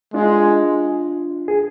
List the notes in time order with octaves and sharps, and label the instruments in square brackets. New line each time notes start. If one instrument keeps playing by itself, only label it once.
[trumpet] G#3 [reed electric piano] D4 F4
[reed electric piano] G#4